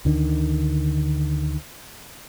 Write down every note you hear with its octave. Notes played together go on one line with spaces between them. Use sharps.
D2 D3 D#3